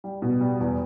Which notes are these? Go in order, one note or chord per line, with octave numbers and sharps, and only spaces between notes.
G3
B2
G3
E2